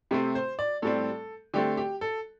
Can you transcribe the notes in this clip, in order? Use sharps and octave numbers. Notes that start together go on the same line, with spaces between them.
C3 A3 C4 G4
C5
D5
A2 G3 C4 A4
D3 A3 C4 G4
G4
A4